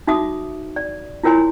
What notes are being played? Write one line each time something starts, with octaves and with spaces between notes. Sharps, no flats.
D#4 F#4 E5 D6 D#6
D5
E4 F4 A#4 C#5 G#5 C6